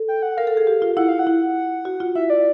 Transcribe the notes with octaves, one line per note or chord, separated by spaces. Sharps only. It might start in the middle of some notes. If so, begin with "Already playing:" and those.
Already playing: A4
G5
F#5
A#4 F5
A4
G#4
G4
F4
E4 F#5
F5
F#5
E4
F#4
F4
E4 E5
D5